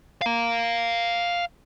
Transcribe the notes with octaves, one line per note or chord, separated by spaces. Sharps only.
F5 A#5